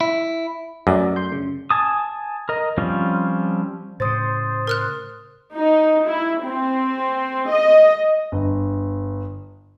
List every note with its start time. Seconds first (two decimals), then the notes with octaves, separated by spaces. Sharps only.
0.01 E4
0.87 F#2 A3 D5
1.16 C6 G6
1.32 C#3
1.70 G#5 A5 D#6
2.49 A#4 D#5
2.78 F3 G3 C4 C#4 F4
4.00 A2 C#3 C5 D#6 A6
4.67 A#4 F6 F#6
5.56 D#4
6.08 E4
6.43 C4
7.52 D#5
8.32 G1